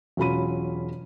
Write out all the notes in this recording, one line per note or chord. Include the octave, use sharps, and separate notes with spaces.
E1 F#3 C#4 F4 B5 D#7